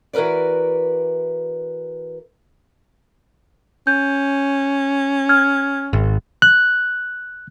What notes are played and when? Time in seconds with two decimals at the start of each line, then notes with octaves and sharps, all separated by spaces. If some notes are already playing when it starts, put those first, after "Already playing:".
0.13 E3 F#4 A#4 B4 D5
3.87 C#4 G6
5.29 F6 G#6
5.93 G#1
6.42 F#6